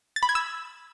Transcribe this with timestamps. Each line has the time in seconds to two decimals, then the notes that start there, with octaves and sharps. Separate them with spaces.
0.16 A6
0.23 B5
0.29 G#6
0.35 E6